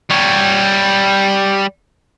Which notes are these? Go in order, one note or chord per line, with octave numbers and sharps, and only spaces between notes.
G3 C#5